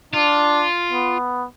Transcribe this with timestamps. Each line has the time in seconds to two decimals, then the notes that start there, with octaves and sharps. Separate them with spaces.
0.14 D4 F4
0.92 B3